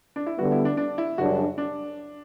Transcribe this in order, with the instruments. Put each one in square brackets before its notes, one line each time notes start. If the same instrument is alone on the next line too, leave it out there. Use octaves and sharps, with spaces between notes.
[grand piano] D4
E4
[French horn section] D3 G3 B3 [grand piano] F#4
[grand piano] E4
D4
D4
E4
[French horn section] F#2 C#3 G3 D4 [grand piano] F#4
[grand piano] D4